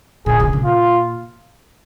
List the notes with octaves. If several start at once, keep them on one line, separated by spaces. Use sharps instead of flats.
A#2 G#4
C#3
A#2
F4